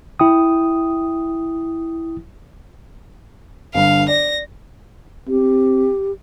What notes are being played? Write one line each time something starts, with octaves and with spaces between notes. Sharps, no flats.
E4 G5 D#6
G1 G2 F5
D5 A#6
C4 G4